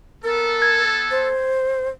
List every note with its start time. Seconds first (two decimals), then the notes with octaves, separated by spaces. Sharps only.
0.23 B3 A4 A#4
0.62 G#6
1.11 C5